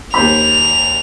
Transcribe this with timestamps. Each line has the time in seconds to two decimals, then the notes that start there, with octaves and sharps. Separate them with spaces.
0.14 D#2 C5 B5 F7